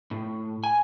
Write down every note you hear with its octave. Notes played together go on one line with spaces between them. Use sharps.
A2
G#5